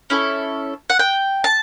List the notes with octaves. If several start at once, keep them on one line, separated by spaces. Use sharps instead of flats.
C#4 E4 A4
F#5
G5
A5